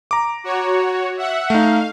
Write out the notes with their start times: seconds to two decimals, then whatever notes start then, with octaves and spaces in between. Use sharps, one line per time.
0.11 A#5 D6
0.44 F#4 C#5
1.17 E5 F#5
1.50 A3 D#4 F5